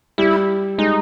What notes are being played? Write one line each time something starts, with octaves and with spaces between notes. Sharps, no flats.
G3 E4
G#3 D#4